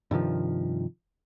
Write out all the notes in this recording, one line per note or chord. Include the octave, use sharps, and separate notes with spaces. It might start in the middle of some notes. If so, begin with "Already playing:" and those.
G2 C3 D#3 F3